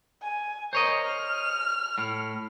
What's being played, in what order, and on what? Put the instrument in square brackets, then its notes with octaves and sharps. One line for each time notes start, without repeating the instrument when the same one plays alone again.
[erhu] G#5
[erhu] A#4 [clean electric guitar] C5 C#5 D#5
[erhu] F6
[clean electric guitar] A2